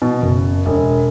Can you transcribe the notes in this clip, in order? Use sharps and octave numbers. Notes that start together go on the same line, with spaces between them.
B2
F#1
E1